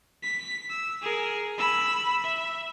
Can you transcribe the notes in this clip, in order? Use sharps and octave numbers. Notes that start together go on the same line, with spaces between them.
B6
E6
G#4 A#4
B5 E6
E5